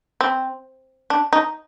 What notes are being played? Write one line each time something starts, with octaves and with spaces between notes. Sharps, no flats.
C4
D4
D#4